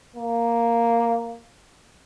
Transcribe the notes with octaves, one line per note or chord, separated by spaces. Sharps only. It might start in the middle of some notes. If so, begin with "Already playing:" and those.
A#3